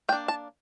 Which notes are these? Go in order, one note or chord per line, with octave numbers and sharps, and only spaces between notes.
A#3 D4 G5
A5